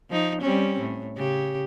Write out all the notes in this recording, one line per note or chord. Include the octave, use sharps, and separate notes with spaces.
F3 D#4
G3 C4 C#4
A2
C#3 G4